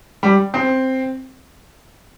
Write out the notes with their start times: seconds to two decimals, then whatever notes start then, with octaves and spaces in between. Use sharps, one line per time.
0.23 G3
0.54 C4